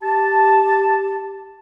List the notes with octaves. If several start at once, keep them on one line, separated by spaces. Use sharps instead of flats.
G4 A5